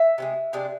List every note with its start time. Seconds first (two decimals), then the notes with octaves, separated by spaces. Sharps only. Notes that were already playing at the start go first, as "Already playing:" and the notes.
Already playing: E5
0.18 C3 E3 G#3
0.53 C3 G#3 D4